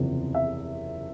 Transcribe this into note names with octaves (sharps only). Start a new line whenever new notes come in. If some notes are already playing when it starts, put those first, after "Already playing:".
Already playing: F#1 E2 C3 F3
E5